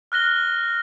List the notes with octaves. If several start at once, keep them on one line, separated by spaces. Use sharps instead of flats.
F6 F#6 A#6 G7